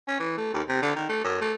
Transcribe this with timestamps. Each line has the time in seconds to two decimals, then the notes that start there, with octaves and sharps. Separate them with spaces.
0.08 C#4
0.20 E3
0.37 A3
0.54 D#2
0.68 C3
0.82 D3
0.96 D#3
1.09 A3
1.24 F#2
1.41 A3